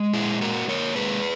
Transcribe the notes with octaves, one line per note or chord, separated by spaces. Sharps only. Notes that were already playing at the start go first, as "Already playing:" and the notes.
Already playing: G#3
A#2 E4 G#4
A#3 F#4 A#4
A#3 A#4 C#5
G#3 G#4 B4